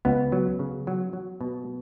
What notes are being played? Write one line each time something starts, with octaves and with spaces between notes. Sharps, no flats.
C#2 B3
F#3
C#3
F#3
F#3
B2